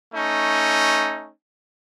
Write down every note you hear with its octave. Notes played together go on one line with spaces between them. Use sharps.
A3 C#4 D#4